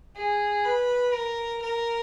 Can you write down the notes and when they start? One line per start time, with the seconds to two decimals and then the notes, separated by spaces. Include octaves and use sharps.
0.16 G#4
0.64 B4
1.13 A#4
1.62 A#4